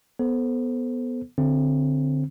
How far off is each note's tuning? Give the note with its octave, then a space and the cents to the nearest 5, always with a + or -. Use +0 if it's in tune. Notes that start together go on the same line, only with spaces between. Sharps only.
B3 +0 A4 +0 C5 +0
D3 +0 C4 +0